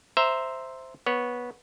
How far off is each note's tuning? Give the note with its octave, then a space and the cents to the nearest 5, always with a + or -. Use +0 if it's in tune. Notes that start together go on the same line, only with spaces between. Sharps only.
C5 +0 E5 +0 A#5 +0
B3 -15 C#5 +0